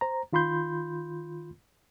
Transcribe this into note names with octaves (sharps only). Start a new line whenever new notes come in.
C5 A#5
D#3 F4 B5 C6 G6